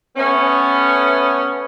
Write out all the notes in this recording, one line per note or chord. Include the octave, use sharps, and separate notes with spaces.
A3 B3 C#4